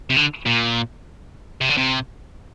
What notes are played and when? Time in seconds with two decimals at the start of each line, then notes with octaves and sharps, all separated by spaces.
0.10 C3
0.16 D3
0.46 A#2
1.61 C3
1.70 D3
1.77 C3